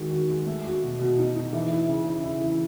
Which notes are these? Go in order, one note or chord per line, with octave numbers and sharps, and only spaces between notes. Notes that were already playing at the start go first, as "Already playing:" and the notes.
Already playing: D#3 G#3 F#4
F#4
G#3
A3
F#4
B2
B2
D#4
D#4
E3
E4
C#3
E4
E4
E3